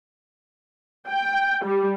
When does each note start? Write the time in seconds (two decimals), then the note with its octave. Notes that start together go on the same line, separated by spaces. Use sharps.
1.09 G5
1.65 G3